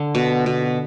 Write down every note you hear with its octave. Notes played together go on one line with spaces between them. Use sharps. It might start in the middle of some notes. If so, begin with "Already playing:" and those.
Already playing: D3
B2
B2